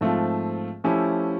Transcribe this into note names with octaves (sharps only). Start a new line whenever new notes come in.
G#2 F3 A3 C4 F4
F3 A3 C#4 E4 G4